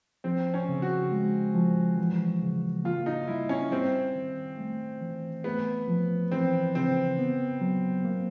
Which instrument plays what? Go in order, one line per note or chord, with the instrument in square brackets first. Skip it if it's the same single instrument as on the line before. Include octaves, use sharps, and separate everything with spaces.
[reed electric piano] F3 [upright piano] C4
[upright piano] C#4
[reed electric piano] C#3
[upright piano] F#4
[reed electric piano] G#3
F3
E3
C#3
[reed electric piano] A#3 [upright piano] F4
[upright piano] D#4
[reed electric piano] G3 [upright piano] E4
[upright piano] C#4
[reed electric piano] G3 [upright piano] C4
[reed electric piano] D#3
A3
E3
[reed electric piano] A3 [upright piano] B3
[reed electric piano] F3
[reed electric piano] E3 [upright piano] C4
[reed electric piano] C#3 [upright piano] C4
[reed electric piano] B3
F#3
A#3